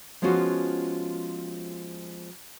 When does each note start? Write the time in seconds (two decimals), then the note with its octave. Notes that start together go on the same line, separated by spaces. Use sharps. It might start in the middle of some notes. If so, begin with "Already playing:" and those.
0.22 F3 G#3 B3 C#4 F4 F#4